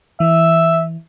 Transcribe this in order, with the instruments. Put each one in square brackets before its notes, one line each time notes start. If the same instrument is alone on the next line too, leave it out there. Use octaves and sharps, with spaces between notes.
[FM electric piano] E3 [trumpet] E5